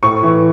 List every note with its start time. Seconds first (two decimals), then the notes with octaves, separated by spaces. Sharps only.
0.03 A2 C#6
0.23 E3